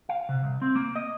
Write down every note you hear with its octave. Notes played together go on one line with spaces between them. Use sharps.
F5
C3
C2
C4
A#3
D#5